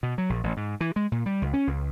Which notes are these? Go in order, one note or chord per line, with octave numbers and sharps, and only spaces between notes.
B2
F#3
A#1
A1
G#2
E3
G#3
A#2
G3
C#2
C#4
C#2